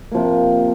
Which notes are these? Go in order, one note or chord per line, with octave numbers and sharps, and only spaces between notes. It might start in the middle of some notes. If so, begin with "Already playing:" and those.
C3 F3 A#3